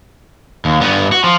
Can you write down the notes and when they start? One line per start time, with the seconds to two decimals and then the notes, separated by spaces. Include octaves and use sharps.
0.65 D#2
0.81 G2 B3
1.12 F#4
1.24 F3